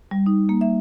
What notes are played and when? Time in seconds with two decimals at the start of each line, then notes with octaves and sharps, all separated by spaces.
0.11 G3
0.26 D#4
0.49 A#3
0.61 E5